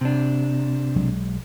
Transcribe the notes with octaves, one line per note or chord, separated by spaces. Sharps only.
C3 D4
B1 F#3 G#3